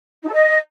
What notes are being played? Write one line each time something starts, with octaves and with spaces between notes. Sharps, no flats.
D#4
A4
D#5